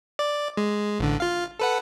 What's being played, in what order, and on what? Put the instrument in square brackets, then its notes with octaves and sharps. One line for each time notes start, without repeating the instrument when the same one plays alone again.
[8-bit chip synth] D5
G#3
A1 D3
F4 F5
A4 B4 F#5